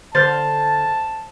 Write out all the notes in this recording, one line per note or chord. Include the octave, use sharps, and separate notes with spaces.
D3 C5 A5 F6 G6 A6